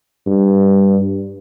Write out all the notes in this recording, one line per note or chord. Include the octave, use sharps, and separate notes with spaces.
G2